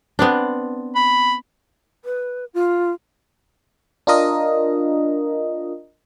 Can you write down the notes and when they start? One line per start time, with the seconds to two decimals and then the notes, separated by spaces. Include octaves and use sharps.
0.19 B3 C4 D4
0.95 B5
2.05 B4
2.54 F4
4.07 D4 F4 A#4 D#5